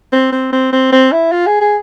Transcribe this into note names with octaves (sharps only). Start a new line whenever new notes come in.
C4
C4
C4
C4
C4
E4
F4
G#4
G#4